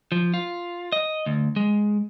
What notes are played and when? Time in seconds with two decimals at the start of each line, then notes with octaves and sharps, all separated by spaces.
0.12 F3
0.34 F4
0.92 D#5
1.26 D2
1.56 G#3